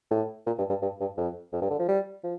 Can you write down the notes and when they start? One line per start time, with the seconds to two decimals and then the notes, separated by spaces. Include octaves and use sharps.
0.11 A2
0.46 A#2
0.58 G2
0.69 G2
0.82 G2
1.00 G2
1.17 F2
1.53 F2
1.61 G2
1.70 D3
1.79 F3
1.88 G3
2.24 F3